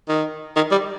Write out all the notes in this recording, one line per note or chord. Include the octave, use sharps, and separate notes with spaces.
D#3
D#3
G3